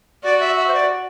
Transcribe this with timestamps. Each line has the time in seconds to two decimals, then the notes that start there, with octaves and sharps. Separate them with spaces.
0.23 F#4 D5
0.40 E5
0.57 E5
0.68 C5
0.74 D5